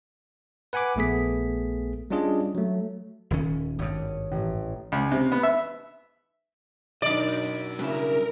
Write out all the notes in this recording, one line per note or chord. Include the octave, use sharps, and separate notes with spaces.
B4 F#5 G#5 B5 D6
A#1 A3 B3 G#4 B6
G3 C#4 D4 F4 G#4 D#5
F#3 A3
D#1 D#3 C#4
G#1 G2 C#5 D#6
A1
C#2
C3
B3
E5
F#2 B2 D4 D#4 D5 D#5
G2 C#3 E4 A#4